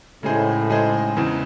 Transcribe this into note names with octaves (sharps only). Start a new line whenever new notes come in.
A2 C#3 G#3 D#4 G#4 C5
C#3 G#3 D#4 G#4 C5
E2 C#3 E3 C4